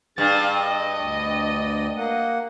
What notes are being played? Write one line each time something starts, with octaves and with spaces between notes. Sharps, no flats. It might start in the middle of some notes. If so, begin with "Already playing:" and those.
G2 G#4 F5 A6
D#5
D2 D5
A#3 F#5